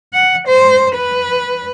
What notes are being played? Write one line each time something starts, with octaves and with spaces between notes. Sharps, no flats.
F#5
C5
B4